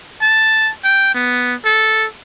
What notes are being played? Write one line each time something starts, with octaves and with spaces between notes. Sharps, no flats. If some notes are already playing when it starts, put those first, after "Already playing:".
A5
G5
B3
A4